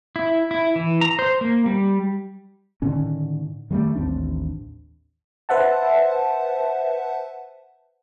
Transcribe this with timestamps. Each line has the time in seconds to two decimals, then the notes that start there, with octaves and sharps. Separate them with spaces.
0.16 E4
0.51 E4
0.76 E3
1.01 A#5
1.19 C5
1.41 A#3
1.66 G3
2.82 A2 D3 D#3 C#4
3.71 D#3 F#3 G3 A3
3.95 A1 D#2 C4 D4
5.49 B4 C5 E5 F#5 A5